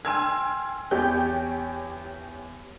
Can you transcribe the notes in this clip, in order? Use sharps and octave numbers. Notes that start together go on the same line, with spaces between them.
G5 G#5 C6 E6 F6 G#6
E2 G4 C#5 G6